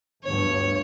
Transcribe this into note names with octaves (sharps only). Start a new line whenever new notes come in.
G1 D2 G2 C#5